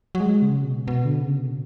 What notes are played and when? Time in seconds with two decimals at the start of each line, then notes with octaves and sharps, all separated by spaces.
0.15 F#3
0.20 G#3
0.42 C#3
0.65 B2
0.88 B2
1.05 D3
1.21 C#3
1.39 B2